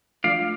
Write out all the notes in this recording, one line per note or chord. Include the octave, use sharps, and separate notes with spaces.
F3 A3 D4 F4 D5 F5